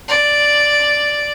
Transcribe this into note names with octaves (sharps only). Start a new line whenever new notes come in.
D5